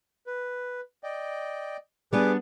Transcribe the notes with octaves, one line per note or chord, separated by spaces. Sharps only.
B4
D5 D#5 G5
G3 B3 D4 G#4 B4 D6